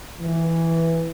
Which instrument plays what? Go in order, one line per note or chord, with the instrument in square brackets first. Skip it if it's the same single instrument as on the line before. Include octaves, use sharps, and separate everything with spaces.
[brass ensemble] E3